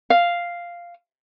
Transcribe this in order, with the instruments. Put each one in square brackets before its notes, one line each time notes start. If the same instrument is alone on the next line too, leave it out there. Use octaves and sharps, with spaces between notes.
[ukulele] F5